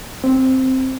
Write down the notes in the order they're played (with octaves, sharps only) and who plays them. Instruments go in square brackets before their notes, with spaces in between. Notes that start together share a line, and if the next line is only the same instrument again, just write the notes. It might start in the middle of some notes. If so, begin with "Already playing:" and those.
[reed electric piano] C4